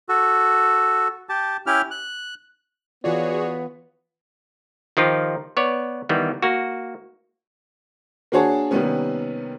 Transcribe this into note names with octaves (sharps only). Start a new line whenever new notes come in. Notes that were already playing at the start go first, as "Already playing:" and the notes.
F#4 A4
G4 A5
C#4 E4 G4 F6
F#6
E3 B3 F4 F#4 G#4 C#5 D5
D#3 F3 D#4 F4 G4
B3 C#5 D5
D#3 E3 G3 B3
A#3 F#4
A#3 D4 F#4 G#4 C#5 A5
C3 D#3 G3 A#3 B3 C#4